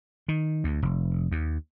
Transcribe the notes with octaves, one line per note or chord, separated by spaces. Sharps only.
D#3
D2
F1
D#2